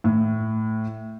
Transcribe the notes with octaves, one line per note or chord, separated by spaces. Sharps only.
A2